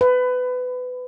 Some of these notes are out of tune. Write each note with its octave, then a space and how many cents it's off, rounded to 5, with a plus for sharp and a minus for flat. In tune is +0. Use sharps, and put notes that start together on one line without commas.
B4 +20